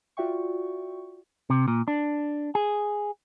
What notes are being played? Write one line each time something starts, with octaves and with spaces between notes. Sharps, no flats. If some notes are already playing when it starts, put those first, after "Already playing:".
F4 F#4 D5 E5 G5 C#6
C3
A#2
D4
G#4